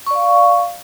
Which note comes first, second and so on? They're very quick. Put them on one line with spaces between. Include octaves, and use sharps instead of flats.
C#6 D5 F5